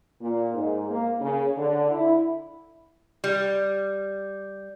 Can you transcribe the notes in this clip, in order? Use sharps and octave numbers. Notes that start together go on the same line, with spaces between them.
A#2
G#2
A#3
C#3
D3
E4
G3